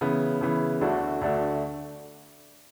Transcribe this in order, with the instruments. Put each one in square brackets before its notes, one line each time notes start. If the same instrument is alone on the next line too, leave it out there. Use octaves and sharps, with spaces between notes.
[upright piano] C#3 E3 B3
C#3 E3 B3
D2 D3 A3 D4 F#4
D2 D3 A3 D4 F#4